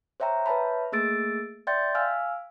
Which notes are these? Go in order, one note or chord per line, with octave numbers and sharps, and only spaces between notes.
C5 C#5 E5 G5 A#5
B4 C#5 E5 A5 B5
A3 A#3 G#4 E6 A6 D7
D5 E5 G5 C6 G6 A6
F5 G#5 E6 F6